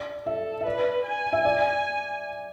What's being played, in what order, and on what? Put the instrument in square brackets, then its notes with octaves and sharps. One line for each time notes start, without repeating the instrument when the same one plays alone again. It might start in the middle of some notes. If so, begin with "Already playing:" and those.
Already playing: [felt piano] D5
[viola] A4 [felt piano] E5
[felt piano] E5
[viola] B4 [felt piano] D5
[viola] G#5
[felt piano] E5
D5